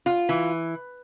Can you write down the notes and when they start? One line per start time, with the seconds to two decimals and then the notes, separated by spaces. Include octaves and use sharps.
0.06 F4
0.29 E3